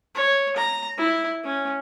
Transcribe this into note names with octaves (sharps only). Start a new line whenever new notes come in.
C#5
A#5
E4
C#4